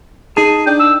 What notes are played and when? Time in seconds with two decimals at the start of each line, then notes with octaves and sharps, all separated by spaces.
0.37 D#4 G#4 A5
0.67 D4 G5
0.80 E6